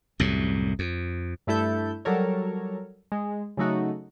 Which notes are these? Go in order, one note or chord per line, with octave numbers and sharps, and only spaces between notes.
C2 F#2 A2
F2
G2 A3 E4 A4 G6
F#3 G3 A4 A#4 C#5
G#3
C#3 F#3 A3 D#4 F#4